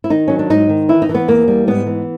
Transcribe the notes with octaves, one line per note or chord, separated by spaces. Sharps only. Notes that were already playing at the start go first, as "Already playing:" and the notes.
E4
D#3 D#4
F#3 C#4
D4
G#2 D#4
D#3
E3 E4
D#4
E3
B3
E2 A#3
G3
G#2 B3
E3